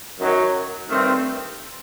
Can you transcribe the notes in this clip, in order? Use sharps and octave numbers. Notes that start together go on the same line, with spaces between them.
F#2 D#3 F#3
G2 D#3 A3 C4